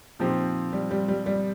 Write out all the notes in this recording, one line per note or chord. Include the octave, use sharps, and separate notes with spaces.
A#2 F3 C4 D#4 G4
G3
G3
G3
G3